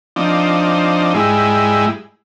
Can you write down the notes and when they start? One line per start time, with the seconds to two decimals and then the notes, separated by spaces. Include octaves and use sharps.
0.16 F3 C4 D4 D#4
1.14 G#2 G3 G#3 E4